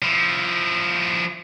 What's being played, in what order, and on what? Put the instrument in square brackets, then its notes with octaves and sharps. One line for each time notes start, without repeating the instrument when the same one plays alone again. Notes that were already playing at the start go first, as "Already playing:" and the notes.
[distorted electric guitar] F3 E4